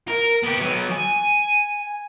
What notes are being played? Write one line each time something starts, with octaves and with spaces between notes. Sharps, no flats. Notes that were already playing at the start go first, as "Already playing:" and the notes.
A#4
B3 G4
F#3 B3
G#5